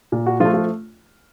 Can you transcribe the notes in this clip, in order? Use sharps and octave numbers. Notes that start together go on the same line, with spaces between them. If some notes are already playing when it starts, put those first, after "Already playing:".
A#2
F#4
F3 A3 F4
F4